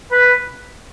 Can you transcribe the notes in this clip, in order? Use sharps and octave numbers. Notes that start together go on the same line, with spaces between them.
B4